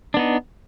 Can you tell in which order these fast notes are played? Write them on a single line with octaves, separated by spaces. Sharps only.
D4 B3 D#4